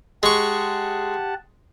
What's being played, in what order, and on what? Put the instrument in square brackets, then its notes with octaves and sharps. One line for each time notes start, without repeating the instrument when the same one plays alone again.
[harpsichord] G#3 C#6 [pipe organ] G4 F#5 A5